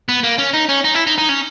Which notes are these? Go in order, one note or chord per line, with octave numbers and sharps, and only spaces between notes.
B3
A#3
C#4
D#4
C#4
D#4
E4
D#4
D#4
C#4